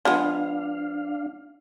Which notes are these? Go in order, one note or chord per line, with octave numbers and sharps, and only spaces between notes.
F3 G#3 B3 D4 F5